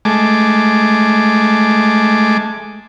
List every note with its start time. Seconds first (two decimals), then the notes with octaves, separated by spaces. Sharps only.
0.05 G#3 A3 D6